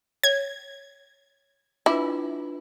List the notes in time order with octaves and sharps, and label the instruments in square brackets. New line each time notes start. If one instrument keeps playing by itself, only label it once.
[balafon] C#5 [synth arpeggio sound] G#6
[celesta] D4 F4 B4 [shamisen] E4 [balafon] D6